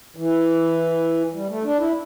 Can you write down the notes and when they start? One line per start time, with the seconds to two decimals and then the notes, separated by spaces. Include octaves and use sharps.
0.16 E3
1.34 G3
1.50 A3
1.64 D4
1.79 E4